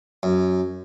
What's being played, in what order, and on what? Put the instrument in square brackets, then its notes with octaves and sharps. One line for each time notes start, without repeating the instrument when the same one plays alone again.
[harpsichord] F#2